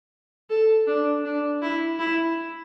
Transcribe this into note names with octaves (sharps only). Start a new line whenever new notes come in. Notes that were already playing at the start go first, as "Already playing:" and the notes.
A4
D4
D4
E4
E4